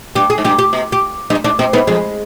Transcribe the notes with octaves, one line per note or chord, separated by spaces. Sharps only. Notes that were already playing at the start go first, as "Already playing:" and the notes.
G2 G4
G#4
G#2
G2 G4
G4
B2
G4
G2 D#4
G#2 D4
B2 C4
G#2 B3
F2 G#3